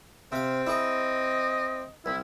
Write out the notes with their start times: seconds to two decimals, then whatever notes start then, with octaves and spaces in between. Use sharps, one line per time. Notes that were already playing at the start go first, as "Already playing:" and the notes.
0.32 C3 C4 F5
0.67 E4 G#4 D#5 G#5
2.06 C2 E4